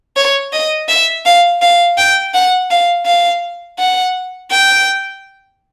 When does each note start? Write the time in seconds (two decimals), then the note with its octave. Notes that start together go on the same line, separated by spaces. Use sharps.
0.16 C#5
0.53 D#5
0.89 E5
1.26 F5
1.62 F5
1.98 G5
2.34 F#5
2.71 F5
3.06 F5
3.79 F#5
4.51 G5